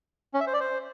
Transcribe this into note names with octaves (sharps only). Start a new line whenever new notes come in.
C#4
E5
C5
D5
C5